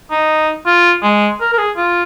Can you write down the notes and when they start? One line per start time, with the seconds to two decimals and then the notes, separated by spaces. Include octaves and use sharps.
0.11 D#4
0.66 F4
1.03 G#3
1.41 A#4
1.53 A#4
1.58 G#4
1.77 F4